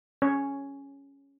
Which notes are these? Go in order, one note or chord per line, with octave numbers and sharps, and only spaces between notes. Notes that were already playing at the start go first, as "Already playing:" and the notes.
C#4 C#5